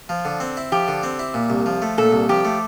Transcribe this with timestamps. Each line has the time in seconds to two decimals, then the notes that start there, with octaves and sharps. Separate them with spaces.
0.09 F3
0.25 D3
0.40 C4
0.57 E4
0.72 F3 G4
0.88 D3
1.03 C4
1.19 E4
1.34 A#2
1.50 C2
1.66 F3
1.82 A3
1.98 A#2 A4
2.12 C2
2.29 F3 G4
2.45 A3